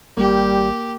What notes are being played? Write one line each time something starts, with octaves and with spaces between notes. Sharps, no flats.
G#1 G3 A#3 G4